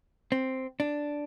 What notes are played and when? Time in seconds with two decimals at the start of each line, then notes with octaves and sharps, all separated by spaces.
0.32 C4
0.80 D4